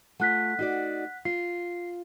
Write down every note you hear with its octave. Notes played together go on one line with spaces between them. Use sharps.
A3 F4 F#5 F#6 B6
D#4 F#4 D5
F4 C7